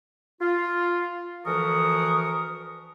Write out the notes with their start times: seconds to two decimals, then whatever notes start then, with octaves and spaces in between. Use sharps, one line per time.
0.41 F4
1.45 D2 E3 F3 A#4 C#6 D#6